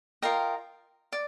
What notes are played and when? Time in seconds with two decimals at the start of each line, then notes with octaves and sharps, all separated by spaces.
0.22 F4 A#4 D#5 G5
1.12 D5